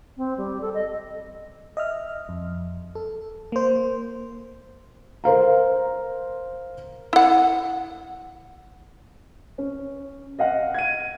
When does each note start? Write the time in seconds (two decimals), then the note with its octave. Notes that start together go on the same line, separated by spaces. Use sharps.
0.17 C4
0.37 G3
0.61 A4
0.74 D#5
1.77 D#5 E5 F6
2.29 F2
2.95 A4
3.52 A#3 C5
5.24 A#4 C5 F5 A#5
7.13 E4 F#5
9.58 C#4
10.39 D#5 F5 F#5
10.74 G#6 D#7